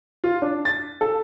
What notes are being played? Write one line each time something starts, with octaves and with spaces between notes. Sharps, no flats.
F4
D4
A6
A4